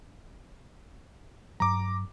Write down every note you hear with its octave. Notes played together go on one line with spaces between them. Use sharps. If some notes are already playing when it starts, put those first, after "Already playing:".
G2 F#3 A#5 D6